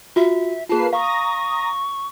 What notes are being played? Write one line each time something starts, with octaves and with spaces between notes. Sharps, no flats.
F4 F#4 E5
A#3 F4 G#4 B4 A5 C7
F5 A#5 C#6 D#6 A#6